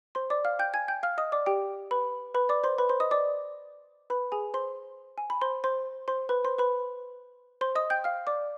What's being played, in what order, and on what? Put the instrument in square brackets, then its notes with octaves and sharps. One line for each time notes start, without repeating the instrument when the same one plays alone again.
[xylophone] C5 C6
D5 D6
F5 F6
G5 G6
G#5 G#6
G5 G6
F5 F6
D#5 D#6
D5 D6
G4 G5
B4 B5
B4 B5
D5 D6
C5 C6
B4 B5
C5 C6
D#5 D#6
D5 D6
B4 B5
G#4 G#5
C5 C6
G#5
B5
C5 C6
C5 C6
C5 C6
B4 B5
C5 C6
B4 B5
C5 C6
D#5 D#6
G5 G6
F5 F6
D5 D6